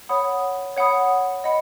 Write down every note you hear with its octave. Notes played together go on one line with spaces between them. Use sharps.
C#5 F#5 B5 D#6
C#5 F#5 B5 D#6
D#5 F#5 B5